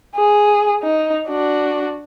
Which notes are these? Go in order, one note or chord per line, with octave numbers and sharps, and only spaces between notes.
G#4
D#4
D4 F#4